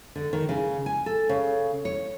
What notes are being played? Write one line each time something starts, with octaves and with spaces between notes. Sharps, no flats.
D3
D#3
C#3
G#5
A4
C#3
C#5